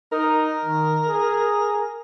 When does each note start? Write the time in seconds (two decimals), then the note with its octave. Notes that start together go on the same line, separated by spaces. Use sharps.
0.12 D#4 A#4
0.65 D#3
1.08 G#4